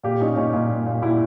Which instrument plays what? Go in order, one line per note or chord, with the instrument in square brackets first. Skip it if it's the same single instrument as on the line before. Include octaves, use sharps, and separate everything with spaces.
[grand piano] A#2 F4 G4
A#2 C#4 D#4
A#2 C#4 D#4
A#2 D#4 F4
A#2
A#2
A#2 E4 F#4